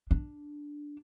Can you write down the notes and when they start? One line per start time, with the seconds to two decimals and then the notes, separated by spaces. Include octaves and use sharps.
0.11 D4